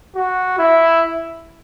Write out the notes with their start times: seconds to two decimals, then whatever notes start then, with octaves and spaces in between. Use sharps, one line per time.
0.16 F#4
0.58 E4